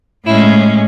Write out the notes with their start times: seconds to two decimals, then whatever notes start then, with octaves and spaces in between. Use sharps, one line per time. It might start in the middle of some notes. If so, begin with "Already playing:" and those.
0.26 A2 G#3 C#4 E4